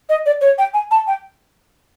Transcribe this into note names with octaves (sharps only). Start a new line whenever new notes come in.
D#5
D5
C#5
G5
G#5
A5
G5